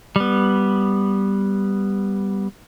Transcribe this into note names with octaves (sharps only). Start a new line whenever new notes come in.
G3 B3